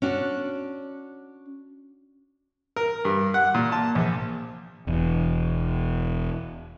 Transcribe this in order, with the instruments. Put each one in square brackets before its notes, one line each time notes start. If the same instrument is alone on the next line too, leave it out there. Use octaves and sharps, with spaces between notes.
[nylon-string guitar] C#4 D4 F#4
[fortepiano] A#4
G2
F#5
A#2
A5
A#1
[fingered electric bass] E1 E2